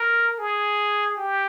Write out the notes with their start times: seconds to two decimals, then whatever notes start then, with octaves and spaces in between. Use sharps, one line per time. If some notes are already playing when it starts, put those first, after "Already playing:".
Already playing: A#4
0.38 G#4
1.17 G4